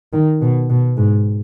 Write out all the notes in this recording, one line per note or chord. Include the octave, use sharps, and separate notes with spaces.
D#3
B2
B2
G#2